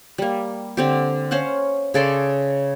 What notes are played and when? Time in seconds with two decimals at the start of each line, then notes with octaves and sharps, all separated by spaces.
0.18 G3 A#3
0.77 D3 C4 G4
1.31 C#4 C5 F5 F#5
1.94 C#3 A4 D5 C6